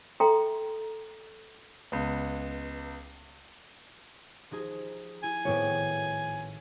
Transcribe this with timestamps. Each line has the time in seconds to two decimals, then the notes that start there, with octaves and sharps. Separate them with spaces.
0.20 A4 E5 G5 A#5 C6
1.92 C#2 B3
4.51 F3 D#4 G#4
5.23 E4 G#5
5.45 G#1 A2 B3 E4 C#5 G5